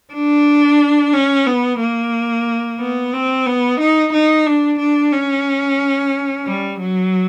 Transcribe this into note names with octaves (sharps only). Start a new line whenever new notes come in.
D4
C#4
B3
A#3
B3
C4
B3
D#4
D#4
D4
D4
C#4
G3
F#3